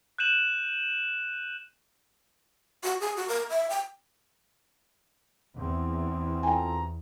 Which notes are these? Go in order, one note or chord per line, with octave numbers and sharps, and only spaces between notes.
F#6 G6 D#7 E7 F#7
F#4
G#4
F#4
A#4
E5
G5
E2 C4
F4 A4 G5 G#5 A#5